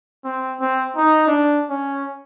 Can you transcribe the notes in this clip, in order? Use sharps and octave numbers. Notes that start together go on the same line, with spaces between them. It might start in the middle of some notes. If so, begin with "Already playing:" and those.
C4
C4
D#4
D4
C#4